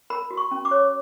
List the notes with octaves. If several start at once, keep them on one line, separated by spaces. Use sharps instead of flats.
A#4 B5
F#4
C#6
C#4
D6
C#5